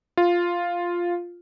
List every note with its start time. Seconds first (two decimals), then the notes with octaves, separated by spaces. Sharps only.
0.17 F4